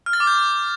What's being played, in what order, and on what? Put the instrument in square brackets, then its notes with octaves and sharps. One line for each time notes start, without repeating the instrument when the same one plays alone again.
[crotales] F6
A6
D6
G6